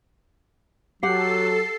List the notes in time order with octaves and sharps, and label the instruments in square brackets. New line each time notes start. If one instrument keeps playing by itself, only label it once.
[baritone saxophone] F#3 [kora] G4 F#5 [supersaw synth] A4 [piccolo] C7